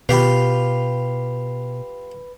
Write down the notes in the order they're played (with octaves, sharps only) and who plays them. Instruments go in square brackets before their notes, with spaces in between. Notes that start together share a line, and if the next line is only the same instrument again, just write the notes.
[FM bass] B2 [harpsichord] F4 G4 F5 [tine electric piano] B4 B5